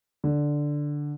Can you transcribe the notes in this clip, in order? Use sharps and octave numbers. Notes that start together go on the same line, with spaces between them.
D3